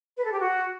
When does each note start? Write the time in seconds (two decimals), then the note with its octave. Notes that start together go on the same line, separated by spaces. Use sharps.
0.17 B4
0.25 A4
0.32 G4
0.40 F#4